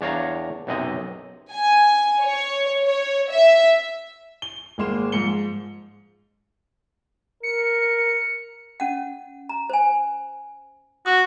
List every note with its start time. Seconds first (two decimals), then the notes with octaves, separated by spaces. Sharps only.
0.01 E2 D4 C#5 F5 A#5
0.67 B1 F#2 C3 D#5
1.52 G#5
2.22 C#5
2.83 C#5
3.30 E5
4.42 G7
4.78 G#1 G#3 A#3 C6 E7
5.12 G#2 F3 C#7 G7
7.43 A#4 C#7
8.80 C#4 F#5
9.49 A#5
9.70 C5 G#5
11.06 F#4 D#6